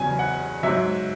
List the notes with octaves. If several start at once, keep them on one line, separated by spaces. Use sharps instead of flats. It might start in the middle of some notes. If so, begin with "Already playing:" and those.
Already playing: E2 C#3 F#3 G#5
F#5
G#2 F#3 E5